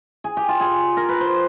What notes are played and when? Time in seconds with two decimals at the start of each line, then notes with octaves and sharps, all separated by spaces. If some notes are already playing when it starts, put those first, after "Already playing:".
0.24 G#4
0.37 G4
0.49 F4
0.61 G#4
0.97 A#4
1.09 B4
1.20 C5